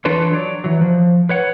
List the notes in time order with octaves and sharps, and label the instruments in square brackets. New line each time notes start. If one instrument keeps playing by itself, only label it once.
[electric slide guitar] E3 D4 F4 A4 B4 C#5
F#3 C#5 D5
E3 F#3
F3
B4 C#5 F#5